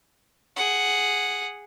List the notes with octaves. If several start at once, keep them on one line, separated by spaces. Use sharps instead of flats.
G#4 F#5